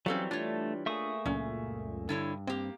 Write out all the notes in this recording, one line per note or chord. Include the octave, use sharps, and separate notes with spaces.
E3 F#3 G3 C4 C#4 A4 F5
A3 D4 F4 C#5
A3 A#3 G#4 E5 C#6 D#6
C#2 F#2 A#2 C#4
G2 D3 E4 C#5
A#3 C4 G4